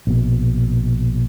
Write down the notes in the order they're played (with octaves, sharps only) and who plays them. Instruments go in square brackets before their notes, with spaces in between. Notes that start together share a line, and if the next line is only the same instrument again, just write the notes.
[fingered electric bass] A#1 B2